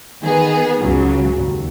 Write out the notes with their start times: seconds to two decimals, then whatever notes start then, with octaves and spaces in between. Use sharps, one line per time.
0.22 D#3 B3 G#4
0.81 C#2 C#3 F#3
1.39 D#2